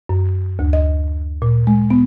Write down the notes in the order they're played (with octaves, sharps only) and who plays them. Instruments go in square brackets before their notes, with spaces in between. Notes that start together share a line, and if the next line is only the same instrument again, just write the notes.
[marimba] F#2
D2
D#5
A#2
G#3
B3